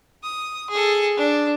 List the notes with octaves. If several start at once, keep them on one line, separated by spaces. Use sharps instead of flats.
D#6
G#4 A4
D4